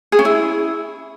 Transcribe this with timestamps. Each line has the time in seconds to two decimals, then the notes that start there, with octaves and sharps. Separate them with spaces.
0.12 G#4
0.19 C#4
0.25 E4